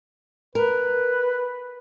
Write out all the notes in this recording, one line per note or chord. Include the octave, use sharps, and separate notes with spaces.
A#4 B4